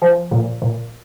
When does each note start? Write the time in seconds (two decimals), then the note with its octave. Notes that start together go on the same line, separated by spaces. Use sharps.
0.02 F3
0.31 A#2
0.62 A#2